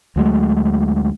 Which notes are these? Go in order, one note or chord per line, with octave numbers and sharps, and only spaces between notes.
D2 F#3 G#3 A3